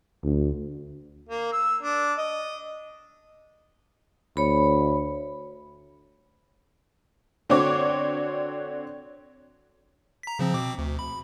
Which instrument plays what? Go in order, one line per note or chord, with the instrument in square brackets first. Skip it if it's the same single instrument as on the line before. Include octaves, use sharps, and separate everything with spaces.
[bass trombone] D2
[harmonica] A#3
E6
D4
D#5
[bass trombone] D2 [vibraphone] C#5 B5
[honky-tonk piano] D3 C4 D4 F#4 C#5 D6
[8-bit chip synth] A#5 B6
C#3 F3 C4
B2 C4 D6
D2
B5